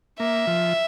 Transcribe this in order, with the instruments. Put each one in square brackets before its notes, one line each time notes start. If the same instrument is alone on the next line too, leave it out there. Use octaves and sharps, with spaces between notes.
[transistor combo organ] A#3 [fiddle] E5
[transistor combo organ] F3